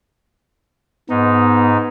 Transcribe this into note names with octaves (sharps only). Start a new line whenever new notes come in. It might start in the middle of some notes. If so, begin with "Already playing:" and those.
G#2 B3 D#4